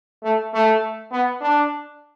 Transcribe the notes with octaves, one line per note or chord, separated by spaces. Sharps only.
A3
A3
B3
D4